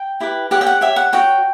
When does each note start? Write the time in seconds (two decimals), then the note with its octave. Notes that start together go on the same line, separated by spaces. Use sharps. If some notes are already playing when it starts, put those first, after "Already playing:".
Already playing: G5
0.20 E4 G4 B4
0.51 G4 C#5 F#5
0.61 G5
0.66 F#5
0.81 G4 C#5 E5
0.96 F#5
1.13 F#4 C#5 G5